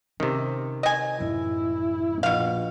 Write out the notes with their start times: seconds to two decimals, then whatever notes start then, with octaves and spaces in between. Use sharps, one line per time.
0.20 C3 D#3 C#4
0.83 D#5 G#5
1.20 A1 F#2 E4
2.23 A#1 B2 F5